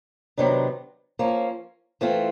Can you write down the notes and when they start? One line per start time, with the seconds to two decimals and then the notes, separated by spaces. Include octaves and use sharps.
0.37 C3 D#3 F#3 B3 D4
1.19 F3 A#3 C#4
2.01 E3 A3 C4 F4